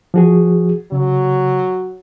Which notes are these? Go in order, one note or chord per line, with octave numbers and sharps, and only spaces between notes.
F3 F#4 G#4
C#3 F#3